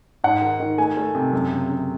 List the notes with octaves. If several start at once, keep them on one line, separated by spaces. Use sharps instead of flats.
G#2 F#5
D#3
D#3
A3 G#5
A3
C3
F#2
C#3
C#3